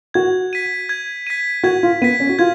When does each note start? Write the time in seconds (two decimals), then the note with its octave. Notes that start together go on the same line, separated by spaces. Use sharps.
0.14 F#4 G#6
0.53 B6 D#7
0.89 G#6
1.27 B6 D#7
1.63 F#4 G#6
1.83 F4
2.02 B3 B6 D#7
2.20 C#4
2.29 F#4
2.39 F4 G#6